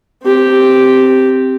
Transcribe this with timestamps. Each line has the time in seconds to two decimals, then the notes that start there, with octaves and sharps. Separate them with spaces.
0.24 C4 G4